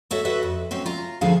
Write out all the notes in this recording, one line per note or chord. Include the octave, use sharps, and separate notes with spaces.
F#4 A4 C#5 E5
F#4 A4 B4 E5
F2
F#3 C4 C#4
F4 A#5
D2 D3 E3 F3 G#4 F5